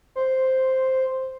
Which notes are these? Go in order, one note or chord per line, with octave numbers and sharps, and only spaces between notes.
C5